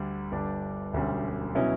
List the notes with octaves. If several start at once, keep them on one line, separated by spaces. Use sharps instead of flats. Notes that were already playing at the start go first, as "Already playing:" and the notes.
Already playing: D2 D3 G3
G1 G2 D3 G3 D4
E1 D2 D3 G3 C#4
B2 F#3 C#4 E4